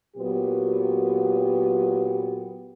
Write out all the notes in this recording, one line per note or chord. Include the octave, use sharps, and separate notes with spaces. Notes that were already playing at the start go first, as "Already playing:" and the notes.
A#2 F#3 B3 G4